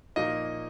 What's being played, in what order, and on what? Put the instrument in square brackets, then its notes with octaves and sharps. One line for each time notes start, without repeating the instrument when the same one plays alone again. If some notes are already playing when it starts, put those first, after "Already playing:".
[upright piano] A#2 F3 A#3 D#4 [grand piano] D#5